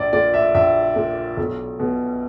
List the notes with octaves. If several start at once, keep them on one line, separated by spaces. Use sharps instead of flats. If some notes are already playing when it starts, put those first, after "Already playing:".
Already playing: A#1 D5
A#2 D5
E5
A#1 E5
A#2
B1
B2